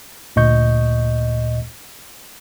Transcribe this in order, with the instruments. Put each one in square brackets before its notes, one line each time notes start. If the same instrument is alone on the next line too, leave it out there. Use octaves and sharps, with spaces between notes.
[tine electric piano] D2 A#2 D#5 C#6 G6